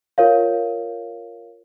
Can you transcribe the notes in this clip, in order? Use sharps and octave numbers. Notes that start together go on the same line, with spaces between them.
F4 A#4 C#5 F5